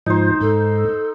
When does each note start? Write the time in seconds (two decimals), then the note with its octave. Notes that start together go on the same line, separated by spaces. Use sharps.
0.06 G#2 F3 D#4 C5
0.41 G#2 A4